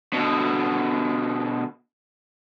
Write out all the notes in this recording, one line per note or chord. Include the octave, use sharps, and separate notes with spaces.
B2 D3